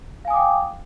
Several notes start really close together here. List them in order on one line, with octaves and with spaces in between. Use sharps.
F5 G#5 D#6 D6 G5